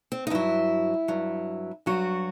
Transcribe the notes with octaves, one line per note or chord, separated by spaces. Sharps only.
C4
D#4
G2 F#3 E4
G2 F#3
G2 F#3 F#4